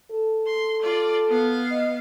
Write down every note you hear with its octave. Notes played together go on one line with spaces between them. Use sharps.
A4
C6
F4 D5
B3 F5
D#5